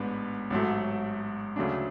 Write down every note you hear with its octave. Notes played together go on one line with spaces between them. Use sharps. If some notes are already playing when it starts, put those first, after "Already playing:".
Already playing: A1 G#2 G#3 B3 D4
A1 G#2 F#3 A3
D2 C#3 F#3 A3 D4